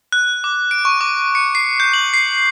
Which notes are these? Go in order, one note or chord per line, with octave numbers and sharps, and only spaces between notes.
F#6
D6
D7
C#6
D6
C#7
C7
G6
F#7
C7